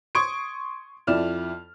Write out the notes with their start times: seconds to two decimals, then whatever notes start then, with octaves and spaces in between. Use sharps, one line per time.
0.15 C6 C#6 D#6 G#6 D7
1.07 F2 E4 D5 F6 E7